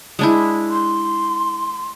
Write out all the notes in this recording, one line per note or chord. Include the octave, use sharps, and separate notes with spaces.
G#3 D4 E4
C6